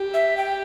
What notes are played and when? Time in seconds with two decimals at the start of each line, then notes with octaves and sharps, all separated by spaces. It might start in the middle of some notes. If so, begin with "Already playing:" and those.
Already playing: G4
0.14 E5
0.37 G5